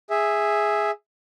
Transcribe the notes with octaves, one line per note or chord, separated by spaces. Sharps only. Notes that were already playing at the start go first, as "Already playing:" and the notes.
G#4 E5